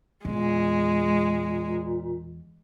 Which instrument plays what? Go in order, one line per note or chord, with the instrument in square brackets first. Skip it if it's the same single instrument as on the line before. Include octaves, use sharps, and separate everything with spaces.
[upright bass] E2 [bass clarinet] A#2 [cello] G#3